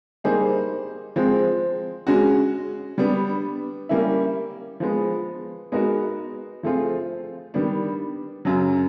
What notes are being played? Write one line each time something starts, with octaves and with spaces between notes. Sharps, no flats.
G3 A#3 D#4 G#4 C5
F3 G#3 C4
G#3 C#4 F#4
G3 B3 D4
G3 A#3 C#4 E4
F3 G#3 B3
G#3 B3 D#4 F#4 A#4
F3 A3 C4 F4 G#4
D#3 G3 B3 D4
F#2 C#3 F#3